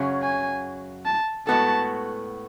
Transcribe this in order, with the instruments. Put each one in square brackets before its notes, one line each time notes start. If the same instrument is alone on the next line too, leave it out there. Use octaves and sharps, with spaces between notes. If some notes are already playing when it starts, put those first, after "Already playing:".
Already playing: [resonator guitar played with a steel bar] F#2 C#3 F#3 C#4 G#4
[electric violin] G#5
A5
[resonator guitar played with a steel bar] A2 G#3 B3 F#4 A4 [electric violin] A5